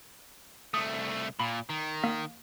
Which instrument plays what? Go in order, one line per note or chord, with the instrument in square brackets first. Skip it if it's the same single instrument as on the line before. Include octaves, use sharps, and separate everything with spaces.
[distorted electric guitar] C2 A3 [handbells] D#6
[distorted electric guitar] A#2 [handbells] B5
[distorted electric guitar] D#3
[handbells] A#3